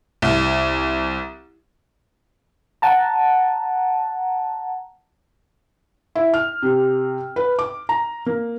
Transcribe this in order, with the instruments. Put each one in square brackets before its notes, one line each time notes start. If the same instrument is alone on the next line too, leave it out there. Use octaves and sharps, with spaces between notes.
[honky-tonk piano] C2
[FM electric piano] F#5 A5 A#5
[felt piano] E4
F6
C3
B4
D6
A#5
A#3